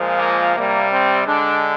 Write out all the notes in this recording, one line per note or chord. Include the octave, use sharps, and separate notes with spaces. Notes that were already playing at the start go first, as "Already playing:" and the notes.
Already playing: A#2 F3 G#3
A#3
C3 G3 A#3
C4
D3 G#3 D4